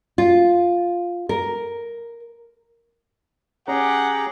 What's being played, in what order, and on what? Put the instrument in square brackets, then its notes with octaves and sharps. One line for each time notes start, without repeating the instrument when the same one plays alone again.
[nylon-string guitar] F4
A#4
[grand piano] C#4 [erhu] G4 [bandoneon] G#4 A#5 [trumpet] F#5